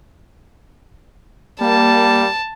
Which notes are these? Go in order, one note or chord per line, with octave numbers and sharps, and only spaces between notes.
G3 A#3 A5